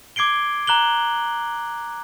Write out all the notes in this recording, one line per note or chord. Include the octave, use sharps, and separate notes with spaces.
D6 G#6 C7 D7 G7
A#5 F#6 F#7 G7